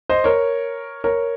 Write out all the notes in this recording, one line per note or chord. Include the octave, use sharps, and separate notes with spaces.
C5 D#5
A#4 C#5
A#4 C#5